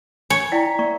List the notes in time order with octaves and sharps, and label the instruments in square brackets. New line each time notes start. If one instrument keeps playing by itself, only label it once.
[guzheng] C#5 [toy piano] G#5
[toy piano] E4 D5 G5 [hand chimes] A#5 B6
[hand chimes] A#3 [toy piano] D5 C#6